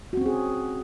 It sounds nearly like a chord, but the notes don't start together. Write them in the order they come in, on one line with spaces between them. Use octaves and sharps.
F#4 C4 C#4 G#4